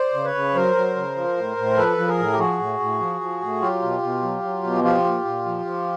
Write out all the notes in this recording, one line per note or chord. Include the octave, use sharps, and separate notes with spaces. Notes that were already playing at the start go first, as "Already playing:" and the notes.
Already playing: C5 D5
C#3
B4 C#5
C#3
F#3 A#4 C5
F#3
C#3
F3
A2
A2
F3 A4 B4
F3
G#4 A#4
A2
G4
F3 F#4 G#4
A2
A2
F3
F3
A2
F#3 F4 G4
B2
B2
F#3
F#3
B2
F3 F4 G4
A#2
A#2
F3
F3